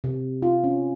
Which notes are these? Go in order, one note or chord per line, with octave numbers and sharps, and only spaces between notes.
C3
F4
C#4